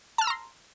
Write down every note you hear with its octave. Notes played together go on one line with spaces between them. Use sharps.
A5 A#5 C6 E6 F6